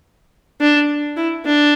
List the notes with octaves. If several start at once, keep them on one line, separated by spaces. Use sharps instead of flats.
D4
E4
D4